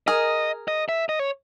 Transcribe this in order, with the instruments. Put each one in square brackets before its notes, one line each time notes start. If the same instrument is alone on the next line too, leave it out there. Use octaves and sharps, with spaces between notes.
[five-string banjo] G#4 A#4 [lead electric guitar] D#5
[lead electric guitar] D#5
E5
D#5
C#5